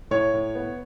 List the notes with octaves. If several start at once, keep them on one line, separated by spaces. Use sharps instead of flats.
A2 C#5
A2
B3